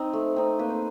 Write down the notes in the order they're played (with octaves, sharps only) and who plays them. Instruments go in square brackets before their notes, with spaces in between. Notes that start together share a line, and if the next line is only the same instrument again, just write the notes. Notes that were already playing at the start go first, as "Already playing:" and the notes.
Already playing: [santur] C4 D#4
A3
C4 D#4
A#3 B4
C5